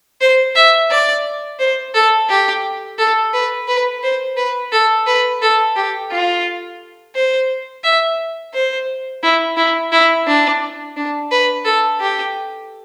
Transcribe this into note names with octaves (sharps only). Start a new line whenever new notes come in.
C5
E5
D5
C5
A4
G4
A4
B4
B4
C5
B4
A4
B4
A4
G4
F4
C5
E5
C5
E4
E4
E4
D4
D4
B4
A4
G4